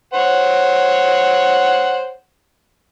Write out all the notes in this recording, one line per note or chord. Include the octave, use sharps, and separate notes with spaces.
C5 C#5 F#5